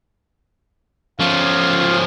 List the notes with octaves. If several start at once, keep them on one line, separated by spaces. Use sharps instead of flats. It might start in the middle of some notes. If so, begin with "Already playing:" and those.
F3 C#4 F4